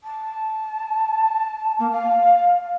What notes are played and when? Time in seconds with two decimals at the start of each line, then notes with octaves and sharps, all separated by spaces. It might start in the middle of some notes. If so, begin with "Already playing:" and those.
0.03 A5
1.79 A#3
1.91 F5